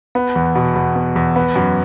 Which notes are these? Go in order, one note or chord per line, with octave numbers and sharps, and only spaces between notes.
B3
E2
B2
E2
B3
E2
B3
F#2